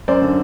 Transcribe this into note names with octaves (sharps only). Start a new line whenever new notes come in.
F#2 C5 D5
D3